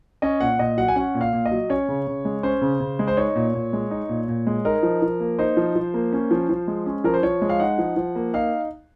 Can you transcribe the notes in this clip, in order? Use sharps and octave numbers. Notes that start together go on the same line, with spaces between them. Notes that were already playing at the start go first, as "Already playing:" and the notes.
C#4 D#5
A#2 F#5
A#2 D#5
F#3 F#5
G#5
C#4 F#5
A#2
F5
A#2
D#5
F#3
C#4 C#5
C#3
C#3
G#3
C#4 C5
C#3
C#3
G#3
C5
D#4 C#5
A#2
A#2
G#3
D#4
A#2
A#2
G#3
D#4 A#4
F3
F3
A#3
D#4 C5
F3
F3
A#3
C#4
F3
F3
G#3
C#4
F3 A#4
C5
F3 C#5
G#3
F5
D#4 F#5
F3
F3
A#3
D#4 F5